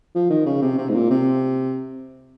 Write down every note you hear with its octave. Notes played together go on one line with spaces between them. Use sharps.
F3
D#3
C#3
C3
C3
G#2
A#2
C3